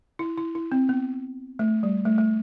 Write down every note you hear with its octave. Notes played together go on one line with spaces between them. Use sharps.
E4
E4
E4
C4
B3
A3
G3
A3
A3